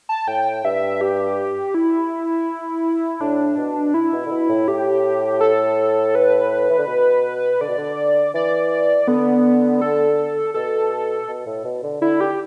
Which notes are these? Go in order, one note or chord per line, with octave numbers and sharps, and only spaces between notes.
A5
A2 G5
G2 E5
G4
E4
A2 D4
B2
E4
B2
D3
B2
A2
A2 G4
A4
B4
E3
D3
B2
D3 D5
B2
D3
E3 D5
D3 B3
A4
B2 A4
B2
A2
B2
D3
D3 E4
G4